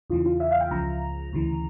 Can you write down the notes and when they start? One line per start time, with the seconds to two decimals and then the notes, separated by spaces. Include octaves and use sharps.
0.10 E2 C#3 E3 F4
0.25 F4
0.40 E5
0.51 F5
0.61 G5
0.71 C#2 C#3 F3 A#5
1.33 D2 C#3 E3